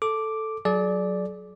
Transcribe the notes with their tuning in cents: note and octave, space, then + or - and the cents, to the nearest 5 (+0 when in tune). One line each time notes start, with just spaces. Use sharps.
A4 +0 D6 +0
F#3 +0 G#4 +45 D5 +0